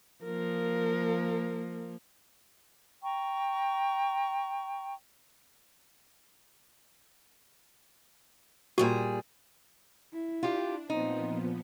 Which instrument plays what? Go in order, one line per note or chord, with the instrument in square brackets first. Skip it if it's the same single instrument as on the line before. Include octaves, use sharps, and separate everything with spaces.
[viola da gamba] F3 A#3 [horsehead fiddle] A#4
[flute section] G5 A#5 C#6
[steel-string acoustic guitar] A#2 G3 G#4 [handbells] F#4
[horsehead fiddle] E4
[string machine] D4 [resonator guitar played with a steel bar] F4 G4
[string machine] A#2 F3 B3 [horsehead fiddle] C4 [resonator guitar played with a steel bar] D#4